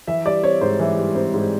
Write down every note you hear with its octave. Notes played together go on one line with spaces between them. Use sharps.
E3 E5
G3 D5
C4 C#5
G#2 C5
E3
G3
C4
G#2